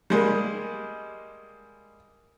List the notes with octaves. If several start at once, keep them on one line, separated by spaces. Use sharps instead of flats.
G3 G#3 A#3